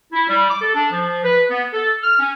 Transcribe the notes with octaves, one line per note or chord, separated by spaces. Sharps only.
E4
G3
D6
A4
D4
F3
B4
B3
A4
F6
C#4